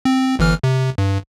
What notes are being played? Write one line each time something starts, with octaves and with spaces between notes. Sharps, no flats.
C4
G1 E3 F6
C3
G2